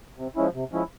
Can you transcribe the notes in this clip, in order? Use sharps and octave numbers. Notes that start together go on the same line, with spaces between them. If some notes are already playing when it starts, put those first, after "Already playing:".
C3
F3 G#3 C#4 E4
C3
F3 G#3 C#4 E4